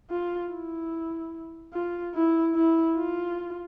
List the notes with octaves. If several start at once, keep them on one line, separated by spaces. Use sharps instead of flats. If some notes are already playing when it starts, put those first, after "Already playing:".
F4
E4
F4
E4
E4
F4